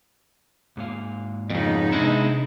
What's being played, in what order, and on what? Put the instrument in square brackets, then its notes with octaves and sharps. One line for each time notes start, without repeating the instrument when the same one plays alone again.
[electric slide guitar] G#2 A#3 F5
[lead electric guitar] F2 C#3 [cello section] B3 D#4
[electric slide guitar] C3 E3 D4 [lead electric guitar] G#3 E4